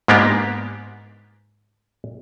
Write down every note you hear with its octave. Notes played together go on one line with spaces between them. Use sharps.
G#2 A#3 B3 D4 G4